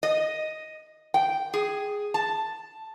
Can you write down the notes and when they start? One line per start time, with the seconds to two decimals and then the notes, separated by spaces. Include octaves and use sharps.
0.03 D#5
1.14 G5
1.54 G#4
2.14 A5